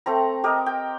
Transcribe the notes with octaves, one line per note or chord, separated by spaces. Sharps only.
A3 C4 A#5
G4 A#4 D#5
G5